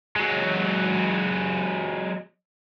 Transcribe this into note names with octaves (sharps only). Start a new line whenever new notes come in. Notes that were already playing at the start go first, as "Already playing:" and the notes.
F#3 G#3